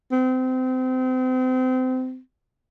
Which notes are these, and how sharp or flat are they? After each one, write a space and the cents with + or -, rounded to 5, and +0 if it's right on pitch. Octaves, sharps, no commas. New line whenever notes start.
C4 -30